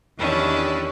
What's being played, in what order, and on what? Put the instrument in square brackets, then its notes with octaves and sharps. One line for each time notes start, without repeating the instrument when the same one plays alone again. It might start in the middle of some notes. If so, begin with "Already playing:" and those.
[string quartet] E2 D#3 C#4 D4 E4 G4